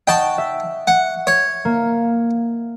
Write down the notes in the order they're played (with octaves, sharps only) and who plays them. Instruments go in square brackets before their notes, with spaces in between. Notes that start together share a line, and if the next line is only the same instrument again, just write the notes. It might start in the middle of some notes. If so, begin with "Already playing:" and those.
[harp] D#5 F#5 C#6 [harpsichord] G5 A5
[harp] E5
[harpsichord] F#5
C#5
[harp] A#3